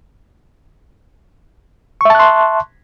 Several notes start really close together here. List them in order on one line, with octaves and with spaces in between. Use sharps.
C#6 E5 A5 F#6 C6